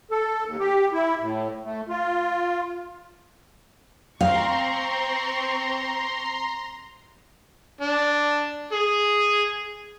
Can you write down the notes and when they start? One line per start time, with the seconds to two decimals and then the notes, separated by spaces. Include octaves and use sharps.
0.11 A4
0.46 D#2
0.60 G4
0.93 E4
1.20 A2
1.65 A3
1.89 F4
4.21 C4 F5 A#5 C6 C#6
7.81 D4
8.72 G#4